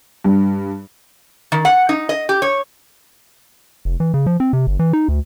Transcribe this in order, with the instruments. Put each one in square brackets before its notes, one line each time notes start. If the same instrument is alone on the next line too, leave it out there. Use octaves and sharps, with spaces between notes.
[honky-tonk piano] G2
[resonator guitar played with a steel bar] D#3
F#5
D#4
D#5
G4
C#5
[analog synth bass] F1
E3
C#3
F3
C4
C3
G1
E3
D#4
D2